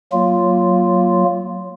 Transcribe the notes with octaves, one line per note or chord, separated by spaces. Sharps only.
F#3 A#3 F4